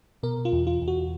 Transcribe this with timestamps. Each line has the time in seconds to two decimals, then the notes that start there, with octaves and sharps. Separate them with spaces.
0.23 B2 A#4
0.45 F4
0.52 E2
0.67 F4
0.82 E2
0.88 F#4